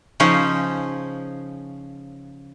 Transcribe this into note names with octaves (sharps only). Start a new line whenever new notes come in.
C#3 F3 C#4 D#4 C5